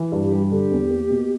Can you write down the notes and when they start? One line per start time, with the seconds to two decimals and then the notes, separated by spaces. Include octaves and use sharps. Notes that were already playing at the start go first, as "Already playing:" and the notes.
Already playing: E3
0.12 G2
0.22 G4
0.32 G3
0.51 D3 G4
0.71 E2
0.90 A#3
1.10 B2